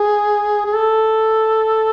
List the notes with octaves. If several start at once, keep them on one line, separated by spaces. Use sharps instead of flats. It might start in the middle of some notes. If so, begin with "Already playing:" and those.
Already playing: G#4
G#4
A4